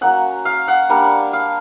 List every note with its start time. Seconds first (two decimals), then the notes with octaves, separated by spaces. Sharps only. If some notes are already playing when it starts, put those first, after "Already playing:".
0.01 F#3 A#3 C#4 F#5
0.45 F5
0.68 F#5
0.89 G3 A#3 D4
1.33 F5